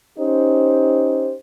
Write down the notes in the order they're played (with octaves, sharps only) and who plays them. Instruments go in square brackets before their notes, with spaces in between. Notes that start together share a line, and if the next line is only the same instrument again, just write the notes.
[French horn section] C#4 D#4 G4 C5